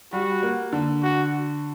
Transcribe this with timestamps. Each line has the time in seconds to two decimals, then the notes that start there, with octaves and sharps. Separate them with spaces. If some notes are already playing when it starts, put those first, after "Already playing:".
0.13 G3 F#4
0.43 A#3
0.73 D3
1.03 F#4